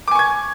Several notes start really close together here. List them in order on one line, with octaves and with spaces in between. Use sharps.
D6 G#5 C#6 G#6